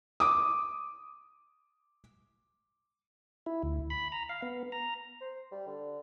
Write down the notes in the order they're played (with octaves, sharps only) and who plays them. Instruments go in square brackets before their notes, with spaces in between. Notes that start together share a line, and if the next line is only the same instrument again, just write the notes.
[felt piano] D6 D#6
[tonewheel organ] E4
D2
B5
A#5
F5
B3
A#5
[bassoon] C5
G3
D3